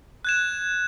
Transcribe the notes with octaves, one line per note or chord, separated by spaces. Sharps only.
F#6 G#6 E7